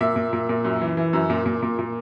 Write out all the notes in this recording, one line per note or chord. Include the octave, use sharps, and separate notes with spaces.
A#2 E5
A#2
A#2
A#2
F#2
E3
E3
F#2
A#2
A#2
A#2
A#2